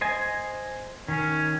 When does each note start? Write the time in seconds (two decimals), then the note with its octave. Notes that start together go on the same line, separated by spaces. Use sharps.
0.01 C5 D#5 G#5
1.08 D#3 C#4